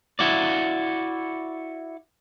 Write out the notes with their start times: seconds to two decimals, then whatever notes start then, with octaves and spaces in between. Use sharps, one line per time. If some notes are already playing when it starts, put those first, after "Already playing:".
0.19 E4 F#4 D5